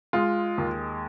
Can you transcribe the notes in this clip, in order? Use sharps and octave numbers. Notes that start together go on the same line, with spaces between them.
G#3 F4
D#2